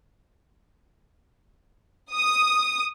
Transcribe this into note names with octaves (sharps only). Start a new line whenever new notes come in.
D#6